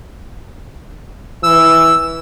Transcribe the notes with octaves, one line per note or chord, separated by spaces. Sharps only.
E3 E6